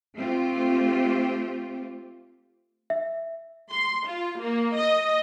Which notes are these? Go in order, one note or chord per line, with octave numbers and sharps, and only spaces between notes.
A3 C4 F4 G4
E5
C6
F4
A#3
D#5